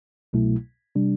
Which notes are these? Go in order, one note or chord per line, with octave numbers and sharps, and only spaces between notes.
C2 B2 F#3 A3 E4
C3 G3 D4